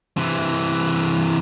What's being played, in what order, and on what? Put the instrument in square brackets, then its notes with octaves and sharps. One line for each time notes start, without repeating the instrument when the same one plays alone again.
[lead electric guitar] C3 E3